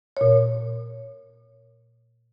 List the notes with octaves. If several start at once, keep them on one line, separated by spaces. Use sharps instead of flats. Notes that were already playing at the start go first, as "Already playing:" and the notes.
A#2 C#5